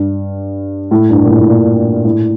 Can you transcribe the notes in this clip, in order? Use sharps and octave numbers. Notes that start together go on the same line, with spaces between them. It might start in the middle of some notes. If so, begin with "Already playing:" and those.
Already playing: G2
A2
G2
A#2
A2
A2
A#2
A2